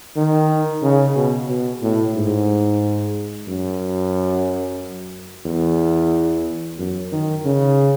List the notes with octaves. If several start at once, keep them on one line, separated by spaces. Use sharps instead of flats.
D#3
C#3
B2
B2
A2
G#2
F#2
E2
F#2
D#3
C#3